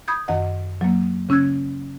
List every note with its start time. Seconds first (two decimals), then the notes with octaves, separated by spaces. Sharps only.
0.08 B5 D#6 G6 G#6
0.28 F#2 D#3 D#5 F#5
0.81 F#3 A#3
1.29 C#3 C#4 E6 F#6 G#6